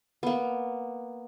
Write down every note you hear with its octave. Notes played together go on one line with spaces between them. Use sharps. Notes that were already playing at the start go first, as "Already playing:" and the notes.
A#3 B3